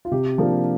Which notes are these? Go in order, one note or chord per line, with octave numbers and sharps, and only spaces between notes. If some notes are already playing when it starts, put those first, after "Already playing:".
F4
C3 G4
F3 A#3 D4